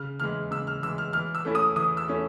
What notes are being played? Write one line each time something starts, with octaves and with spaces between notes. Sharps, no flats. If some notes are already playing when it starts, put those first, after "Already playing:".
Already playing: C#3 F6
E3 G#3 F6
C#3 E6
F6
E3 G#3 E6
F6
E3 F6
E6
A3 C#4 E4
D#6
E3 D#6
E6
A3 C#4 E4